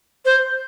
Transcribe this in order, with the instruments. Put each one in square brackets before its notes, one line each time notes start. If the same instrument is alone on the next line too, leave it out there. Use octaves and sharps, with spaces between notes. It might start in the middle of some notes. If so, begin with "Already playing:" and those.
[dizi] C5